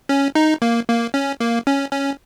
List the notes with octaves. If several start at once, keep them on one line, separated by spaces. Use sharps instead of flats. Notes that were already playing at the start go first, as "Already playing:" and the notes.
C#4
D#4
A#3
A#3
C#4
A#3
C#4
C#4